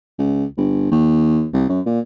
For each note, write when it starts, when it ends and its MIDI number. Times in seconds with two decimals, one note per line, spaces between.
0.19 0.44 37
0.57 0.90 31
0.91 1.46 39
1.53 1.64 36
1.69 1.80 42
1.86 1.99 46